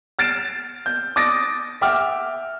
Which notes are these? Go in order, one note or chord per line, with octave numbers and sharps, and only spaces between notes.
F6 A6 C7 D7 E7
G6
D6 D#6 A6 A#6 D7
E5 F#5 G5 D6 F6